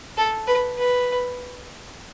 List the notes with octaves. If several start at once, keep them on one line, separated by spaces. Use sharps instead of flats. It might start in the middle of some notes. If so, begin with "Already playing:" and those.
A4
B4
B4